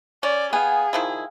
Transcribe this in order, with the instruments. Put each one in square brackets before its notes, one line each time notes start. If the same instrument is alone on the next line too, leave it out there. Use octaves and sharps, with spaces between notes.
[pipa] C#4 [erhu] D5
[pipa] B3 [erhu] G#4 [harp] F5 G5 G#5
[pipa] D#3 F3 E4